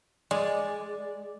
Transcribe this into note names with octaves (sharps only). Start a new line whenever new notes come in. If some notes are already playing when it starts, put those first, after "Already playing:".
G#3 D5